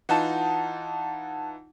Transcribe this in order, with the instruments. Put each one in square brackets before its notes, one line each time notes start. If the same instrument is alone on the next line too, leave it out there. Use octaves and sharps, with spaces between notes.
[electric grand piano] E3 D#4 F4 [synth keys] F#5 A5